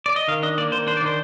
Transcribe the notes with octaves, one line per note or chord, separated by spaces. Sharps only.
D5
D#5
D#3 F5
D4 D#5
A#3 D5
D#3 C5
D4 C5
D5
D#3 C5